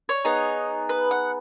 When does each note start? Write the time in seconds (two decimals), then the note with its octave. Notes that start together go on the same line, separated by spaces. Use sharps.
0.09 C#5
0.25 B3 D#4 G#4
0.89 B4
1.11 F#5